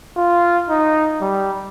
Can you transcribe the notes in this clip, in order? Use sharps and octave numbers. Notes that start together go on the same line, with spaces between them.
F4
D#4
G3